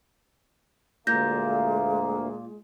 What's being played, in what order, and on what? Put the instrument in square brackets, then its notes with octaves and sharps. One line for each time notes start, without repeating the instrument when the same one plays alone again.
[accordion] D2 A#3 [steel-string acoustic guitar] A#2 [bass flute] G#3 [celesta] G6 A#6